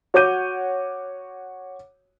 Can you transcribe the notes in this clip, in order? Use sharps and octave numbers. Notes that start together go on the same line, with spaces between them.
F#4 C#5 F#5 D6 G6 D#7